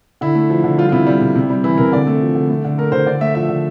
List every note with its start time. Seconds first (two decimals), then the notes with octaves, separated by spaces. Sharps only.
0.21 D3 E4
0.35 A3
0.50 F3
0.64 D3
0.78 G3 F4
0.89 F4
0.92 C3 E4
1.07 G3
1.22 C3
1.35 C3
1.50 G3
1.64 E3 E4
1.78 C3 A#4
1.92 D3 D5
2.07 A3
2.21 F3
2.35 D3
2.49 A3
2.64 D3
2.78 A3 A#4
2.92 D3 C5
3.06 D3 D5
3.21 A3 E5
3.35 F3 E5
3.49 D3